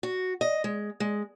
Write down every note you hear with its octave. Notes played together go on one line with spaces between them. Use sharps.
F#4
D#5
G#3
G#3